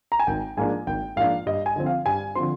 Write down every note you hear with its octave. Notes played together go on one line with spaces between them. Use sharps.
A#5
G#5
G#1 G5
G#2 F3 A#3 D4 G#5
G#1 G5
G#2 F3 A#3 D4 F5
G2 D#5
G#5
D3 F3 C4
F5
G2 G#5
D3 F3 C4 C6